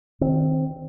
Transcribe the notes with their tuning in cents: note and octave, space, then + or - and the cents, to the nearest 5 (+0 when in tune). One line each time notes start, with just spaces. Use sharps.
D#3 +0 C4 +0